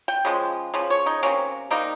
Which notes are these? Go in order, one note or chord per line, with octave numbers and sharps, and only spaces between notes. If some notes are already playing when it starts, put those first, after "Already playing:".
G5
C#3 F3 G#3
C#3 F3
C#5
D#4
C3 G3 A#3 C#4
C3 G3 A#3 D#4